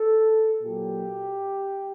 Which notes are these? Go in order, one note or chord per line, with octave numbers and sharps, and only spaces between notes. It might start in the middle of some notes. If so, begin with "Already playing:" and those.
Already playing: A4
A#2 F#3 G4